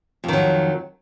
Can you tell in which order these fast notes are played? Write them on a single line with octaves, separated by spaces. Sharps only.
F2 D#3 F#3